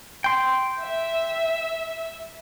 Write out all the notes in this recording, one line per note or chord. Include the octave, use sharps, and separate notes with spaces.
G5 C6
E5